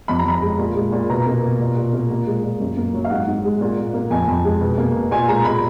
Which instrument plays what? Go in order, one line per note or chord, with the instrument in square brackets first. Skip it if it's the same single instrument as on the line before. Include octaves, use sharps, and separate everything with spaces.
[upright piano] F2 B5
A#5
F2 B5
G#3
A#2
G#3
A#2
B2 A#5
A#3
B2
A#2
A#2
A#3
A#2
G#3
A#2
F#2
A#3
F#3
F5
G#2 F#5
G#2
G#3
A#2
A#2
A#3
F2 G#5
F2
G#3
B2
A#3
B2
A#2 G#5
G#3 A#5
A#2 B5